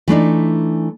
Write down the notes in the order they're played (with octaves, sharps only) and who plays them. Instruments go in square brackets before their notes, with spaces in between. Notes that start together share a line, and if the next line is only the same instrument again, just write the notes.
[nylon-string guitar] E3 A3 D4 D#4